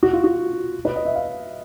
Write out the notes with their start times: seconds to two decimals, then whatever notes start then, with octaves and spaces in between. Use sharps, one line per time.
0.03 F#4
0.13 F4
0.24 F#4
0.85 B4
0.96 D#5
1.05 E5
1.15 F5